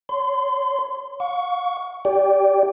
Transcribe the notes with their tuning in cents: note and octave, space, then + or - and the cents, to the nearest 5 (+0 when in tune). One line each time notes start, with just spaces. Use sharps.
C#5 +0 C6 -30
F5 +40 C#6 +15
G4 +0 D5 -20 G5 +0